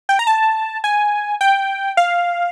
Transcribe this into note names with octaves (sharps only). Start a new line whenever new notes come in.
G5
A#5
A5
G#5
G5
F5